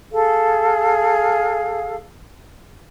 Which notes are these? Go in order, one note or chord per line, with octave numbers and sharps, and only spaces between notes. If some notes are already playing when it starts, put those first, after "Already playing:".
G#4 A4 F5